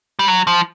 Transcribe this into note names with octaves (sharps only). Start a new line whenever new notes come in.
G3
F#3
F3